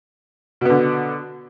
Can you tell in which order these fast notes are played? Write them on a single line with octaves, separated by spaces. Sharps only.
B2 B3 D3